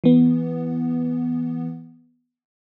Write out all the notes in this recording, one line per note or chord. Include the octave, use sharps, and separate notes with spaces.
E3 B3